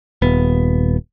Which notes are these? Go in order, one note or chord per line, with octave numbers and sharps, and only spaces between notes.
D#1 B3